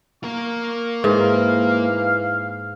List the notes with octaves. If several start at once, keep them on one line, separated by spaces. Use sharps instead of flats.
A#3 A#4 C#6
G#2 E3 F5